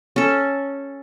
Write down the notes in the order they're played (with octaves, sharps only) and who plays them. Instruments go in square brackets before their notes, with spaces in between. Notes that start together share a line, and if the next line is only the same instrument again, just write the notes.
[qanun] C#4 A4